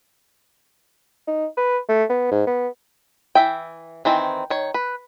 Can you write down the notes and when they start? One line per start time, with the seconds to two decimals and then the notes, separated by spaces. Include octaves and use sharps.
1.27 D#4
1.57 B4
1.89 A3
2.09 B3
2.31 G#2
2.47 B3
3.35 E3 E5 G5
4.05 D#3 E3 C4
4.50 D#3 C#5
4.74 B4